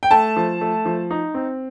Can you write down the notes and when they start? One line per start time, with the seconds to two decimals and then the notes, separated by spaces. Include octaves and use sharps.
0.03 G5
0.11 A3 A5
0.36 F3
0.61 A3
0.85 F3
1.11 D#4
1.34 C4